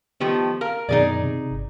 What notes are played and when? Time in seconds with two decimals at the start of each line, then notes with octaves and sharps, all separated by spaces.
0.20 D#3 F3 A3 B3 G4
0.61 A#4 F5
0.89 F#2 B2 D#3 D#4 G#4 D5
1.23 C3
1.51 G1